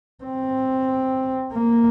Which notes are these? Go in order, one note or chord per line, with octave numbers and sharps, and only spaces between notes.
C4
A#3